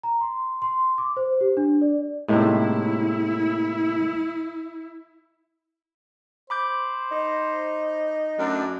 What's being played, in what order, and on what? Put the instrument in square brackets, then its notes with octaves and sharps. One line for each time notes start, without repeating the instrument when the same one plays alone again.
[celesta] A#5
C6
C6
D6
C5
G4
D4
D5
[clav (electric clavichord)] A2 C3 [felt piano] G#3 A#3 D#4 [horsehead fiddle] E4
[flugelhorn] C5 [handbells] B5 D6 G6
[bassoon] D#4
[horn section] F#2 D4 [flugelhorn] A3